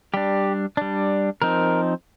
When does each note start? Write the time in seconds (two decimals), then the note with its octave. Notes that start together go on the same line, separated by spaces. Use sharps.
0.14 G3 D4 G4
0.77 G3 D4
1.42 F3 C4 D#4 A#4